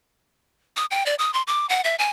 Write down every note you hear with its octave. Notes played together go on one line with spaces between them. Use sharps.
D#6
G5
D5
D#6
C6
D6
F#5
E5
G#5